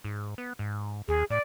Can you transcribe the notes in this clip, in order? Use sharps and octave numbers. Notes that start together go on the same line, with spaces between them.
G#2
B3
G#2
D#2 G#4
A2 D5